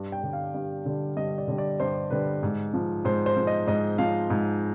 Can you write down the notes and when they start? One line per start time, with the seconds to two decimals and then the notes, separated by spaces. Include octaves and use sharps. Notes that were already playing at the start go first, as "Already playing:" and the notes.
Already playing: G2
0.12 G5
0.23 D3 G3
0.33 F5
0.54 G2
0.85 D3 G3
1.17 G2 D#5
1.38 D5
1.48 D3 G3
1.58 D5
1.80 G2 C5
2.10 D3 G3 B4
2.43 G#2
2.74 F3
3.05 G#2 C5
3.26 C5
3.37 F3
3.47 D#5
3.67 G#2 D#5
3.98 F3 F5
4.30 G#2